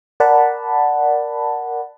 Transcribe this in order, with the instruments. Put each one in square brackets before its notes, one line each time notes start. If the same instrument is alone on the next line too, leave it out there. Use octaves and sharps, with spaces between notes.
[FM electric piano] A#4 D5 F#5 A5 B5